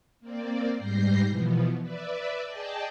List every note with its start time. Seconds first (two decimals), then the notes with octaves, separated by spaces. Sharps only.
0.20 A#3 C4 D5
0.77 G#2 G3 G6 A#6 C7
1.28 B2 E3 F3 B3
1.81 B4 D5 E5
2.45 G#4 D5 D#5 G5 A5